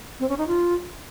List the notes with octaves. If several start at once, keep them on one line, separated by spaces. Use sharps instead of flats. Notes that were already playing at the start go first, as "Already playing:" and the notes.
C4
C#4
D#4
F4